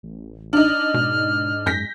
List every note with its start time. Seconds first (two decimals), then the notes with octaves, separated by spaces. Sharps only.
0.03 A1
0.53 D4 D#4 F6
0.94 G#2 B2
1.66 F#2 G6 A#6 B6